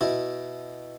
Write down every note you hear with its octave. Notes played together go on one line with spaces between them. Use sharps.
B2 E4